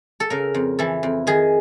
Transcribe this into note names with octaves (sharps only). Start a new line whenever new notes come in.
A4
C#3 A#4
F2
E3 A4
F2
D#3 G#4